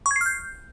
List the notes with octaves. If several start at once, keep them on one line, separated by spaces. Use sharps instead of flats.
C#6
G#6
C7
F6
G6